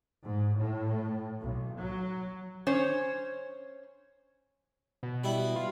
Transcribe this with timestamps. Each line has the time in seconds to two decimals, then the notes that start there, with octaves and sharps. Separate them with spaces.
0.23 G#2
0.57 A2
1.41 B1
1.81 F#3
2.67 C#4 C5 C#5
5.03 B2
5.24 G3 E4
5.56 F4